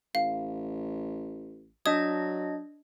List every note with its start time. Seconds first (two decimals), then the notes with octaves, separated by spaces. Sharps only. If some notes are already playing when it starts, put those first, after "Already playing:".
0.15 A1 F5
1.86 F#3 D4 D#5 D#6 G#6